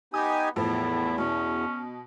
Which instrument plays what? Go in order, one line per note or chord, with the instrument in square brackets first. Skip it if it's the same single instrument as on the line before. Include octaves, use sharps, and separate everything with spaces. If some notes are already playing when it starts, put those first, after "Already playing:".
[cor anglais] B3 [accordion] D#4 G4 G#5 [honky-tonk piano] D#6
[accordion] E2 [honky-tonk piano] A2 F3 [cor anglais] E4
[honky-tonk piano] B2 [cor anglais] C#4